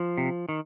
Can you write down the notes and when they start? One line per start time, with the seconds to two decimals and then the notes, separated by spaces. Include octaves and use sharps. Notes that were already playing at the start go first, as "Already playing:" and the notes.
Already playing: F3
0.18 C3
0.49 D#3